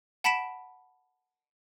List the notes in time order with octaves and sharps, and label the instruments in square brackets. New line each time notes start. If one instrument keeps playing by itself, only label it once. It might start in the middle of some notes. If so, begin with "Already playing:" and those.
[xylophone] F#5 A5 B5 B6 D7 E7